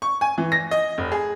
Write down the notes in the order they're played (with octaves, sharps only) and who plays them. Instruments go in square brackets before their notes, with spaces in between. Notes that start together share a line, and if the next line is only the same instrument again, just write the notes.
[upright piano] C#6
G#5
E3
A#6
D#5
F1
G#4